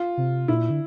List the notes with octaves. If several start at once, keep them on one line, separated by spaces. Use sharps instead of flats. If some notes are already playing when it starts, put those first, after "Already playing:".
Already playing: F4
C3
A#2 E4
D3